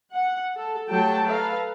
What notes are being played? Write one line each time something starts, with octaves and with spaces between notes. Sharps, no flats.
F#5
A4
F#3 A3 G4 A4 G5 A5
A4 B4 F5 A#5